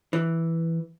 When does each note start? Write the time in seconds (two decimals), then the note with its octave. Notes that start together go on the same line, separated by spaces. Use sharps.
0.13 E3